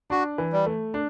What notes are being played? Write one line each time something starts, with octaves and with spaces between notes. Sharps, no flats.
D4 F#4
E3
G3
A3
D4